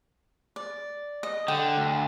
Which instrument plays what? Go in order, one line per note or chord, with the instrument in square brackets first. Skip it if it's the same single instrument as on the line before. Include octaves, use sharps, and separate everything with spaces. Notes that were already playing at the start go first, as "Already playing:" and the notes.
[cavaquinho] D5
D#5
[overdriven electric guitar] D3 [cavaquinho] G5
[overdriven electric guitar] D2